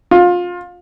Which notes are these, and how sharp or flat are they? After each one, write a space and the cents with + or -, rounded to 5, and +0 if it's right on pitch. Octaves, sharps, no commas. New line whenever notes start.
F4 +25